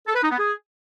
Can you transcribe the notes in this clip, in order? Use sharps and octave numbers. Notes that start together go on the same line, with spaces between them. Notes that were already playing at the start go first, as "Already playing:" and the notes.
A4
B4
D#4
B3
G#4